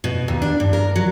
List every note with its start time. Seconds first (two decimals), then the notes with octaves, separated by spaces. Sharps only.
0.04 B2
0.28 D#2
0.42 D4
0.60 G2
0.73 A#4
0.96 F#3